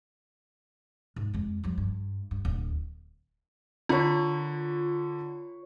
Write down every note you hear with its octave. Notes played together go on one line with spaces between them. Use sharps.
G#2
F2 G#3
F3 G3
G2
G2
D1
D3 F4 C#5 B5